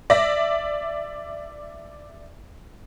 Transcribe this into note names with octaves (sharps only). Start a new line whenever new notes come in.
D5 E5 A#6